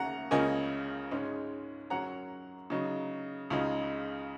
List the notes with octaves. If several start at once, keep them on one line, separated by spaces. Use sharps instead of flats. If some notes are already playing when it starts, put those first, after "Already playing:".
Already playing: D#2 C#3 C#4 F#5 A#5
C#2 C#3 A#3 C#4 D#5 G#5
G#2 G#3 C#4
F#2 F#3 C#4 F#5 A#5
C#3 F#3 D#4
C#2 C#3 G#3 D#4